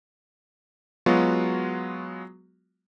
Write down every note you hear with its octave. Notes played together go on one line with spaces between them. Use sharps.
F#3 G#3 B3 F4 F#4